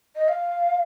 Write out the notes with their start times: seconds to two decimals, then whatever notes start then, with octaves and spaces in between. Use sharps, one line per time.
0.15 D#5
0.28 F5